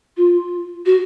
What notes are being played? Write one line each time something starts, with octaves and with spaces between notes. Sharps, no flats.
F4
F#4